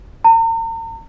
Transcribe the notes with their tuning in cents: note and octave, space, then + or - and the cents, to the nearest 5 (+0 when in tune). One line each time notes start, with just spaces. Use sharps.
A#5 -40